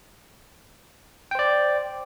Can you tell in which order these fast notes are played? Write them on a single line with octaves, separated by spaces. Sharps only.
G5 C5 D5